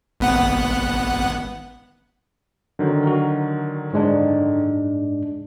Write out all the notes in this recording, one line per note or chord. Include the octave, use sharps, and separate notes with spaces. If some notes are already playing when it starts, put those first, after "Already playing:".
G#1 B3 F#5
D3 D#3 F#3
F#4 A#4
G#2 G#3 D4